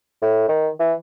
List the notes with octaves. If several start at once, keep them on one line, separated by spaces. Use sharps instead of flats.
A2
D#3
E3